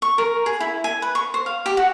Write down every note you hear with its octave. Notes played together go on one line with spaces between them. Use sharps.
C#6
A#4
G#4
E4
G#5
B4
C#6
C5
F5
G4
F#4